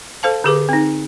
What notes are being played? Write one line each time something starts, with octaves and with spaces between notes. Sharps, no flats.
A4 C5 F5 A5
D3 G4 G#4 B4 D6
C4 D#4